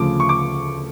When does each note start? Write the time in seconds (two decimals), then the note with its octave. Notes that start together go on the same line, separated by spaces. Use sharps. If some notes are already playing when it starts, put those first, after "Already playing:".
Already playing: D2 C#3 F3 D6
0.20 C#6
0.29 D6